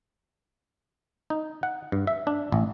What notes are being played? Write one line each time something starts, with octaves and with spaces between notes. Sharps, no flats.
D#4
F#5
G2
E5
D4
A1